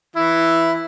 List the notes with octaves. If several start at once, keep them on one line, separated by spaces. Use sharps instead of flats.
E3 E4